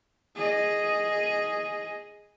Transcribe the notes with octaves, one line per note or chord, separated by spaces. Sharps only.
G#4 D#5